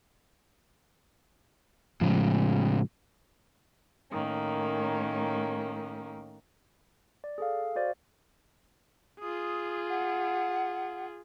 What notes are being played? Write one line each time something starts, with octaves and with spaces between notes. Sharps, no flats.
A2 C#3 F3 G#3
A2 D#3 A#3 C#4
D5
G#4 A4 F5
F#4 C5 D5 D#5 F5
F4 G#4 D#6
F#5